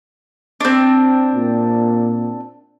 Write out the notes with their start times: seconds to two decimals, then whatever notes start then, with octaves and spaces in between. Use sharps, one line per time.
0.60 C4 D4
1.34 A#2